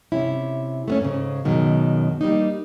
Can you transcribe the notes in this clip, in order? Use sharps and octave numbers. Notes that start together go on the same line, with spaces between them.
C3 C#4 E4
A3 B3 C#4
G#2 C#3
F#2 B2 D#3 G#3
G3 A#3 D#4